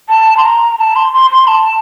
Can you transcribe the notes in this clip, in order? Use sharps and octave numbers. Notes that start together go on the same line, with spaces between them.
A5
C6
A#5
A5
C6
C6
C6
A5